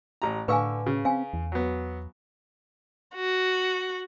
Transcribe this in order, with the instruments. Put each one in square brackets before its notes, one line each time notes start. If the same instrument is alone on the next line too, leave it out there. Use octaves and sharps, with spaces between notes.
[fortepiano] A1 A#5
[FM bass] A2 [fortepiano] D3 C#6 E6 [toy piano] B4 F5 G#5
[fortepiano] C#3
[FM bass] C4 [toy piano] F5 G#5
[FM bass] E2
[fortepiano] F#3 B3
[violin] F#4